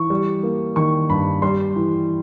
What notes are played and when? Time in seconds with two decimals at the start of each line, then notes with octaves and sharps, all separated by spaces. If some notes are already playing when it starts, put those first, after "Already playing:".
Already playing: E3 C#6
0.10 G3
0.43 A#3
0.76 D#3 C#6
1.10 G2 B5
1.42 G3 C6
1.76 E3